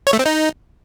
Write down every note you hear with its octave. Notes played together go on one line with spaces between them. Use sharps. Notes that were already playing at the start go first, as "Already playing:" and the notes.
C#5
A3
C4
D#4